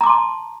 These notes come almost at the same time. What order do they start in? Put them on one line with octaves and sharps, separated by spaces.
A#5 D6 C6 A5